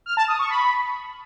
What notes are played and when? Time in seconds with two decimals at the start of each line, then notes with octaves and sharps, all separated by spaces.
0.06 F6
0.17 A5
0.28 D#6
0.39 C#6
0.50 B5